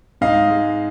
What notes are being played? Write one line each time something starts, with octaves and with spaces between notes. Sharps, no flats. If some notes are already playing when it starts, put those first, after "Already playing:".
G#2 D#5 F5
G#3